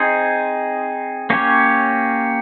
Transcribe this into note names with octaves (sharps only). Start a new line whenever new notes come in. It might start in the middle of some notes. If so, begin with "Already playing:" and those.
Already playing: C4 D#4 G#4 C5
A#3 C#4 G4 C#5